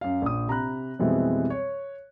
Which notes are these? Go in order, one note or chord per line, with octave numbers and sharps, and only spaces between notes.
F#2 F5
A#1 D#6
C3 A#5 B5 F#6
F2 B2 E3 G3 G#3 C4
C#5